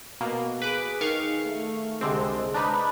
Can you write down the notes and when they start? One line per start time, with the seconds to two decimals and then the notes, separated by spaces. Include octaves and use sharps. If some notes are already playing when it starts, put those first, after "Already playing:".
0.21 B2 A#3
0.62 G#4 B4 D6
1.01 D#3 F5 C#6
1.46 A3
2.01 C2 D3 G#3 C4
2.54 G#3 D4 D#4 B4